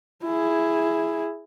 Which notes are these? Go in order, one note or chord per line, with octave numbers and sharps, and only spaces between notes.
E4 G#4